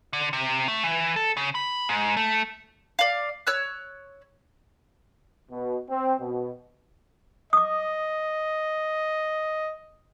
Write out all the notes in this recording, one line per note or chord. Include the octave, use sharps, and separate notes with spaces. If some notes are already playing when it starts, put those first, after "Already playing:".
D3
C3
A3
E3
A4
C#3
B5
G#2
A3
D5 F5
C#5 E6 F#6
B2
C4
B2
D#5 D6 D#6